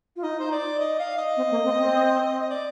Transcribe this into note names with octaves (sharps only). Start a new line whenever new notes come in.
F4
D#4 D#5
C5
D5
D#5
F5
D#5
C4
A#3
C4
C4
D#5
D5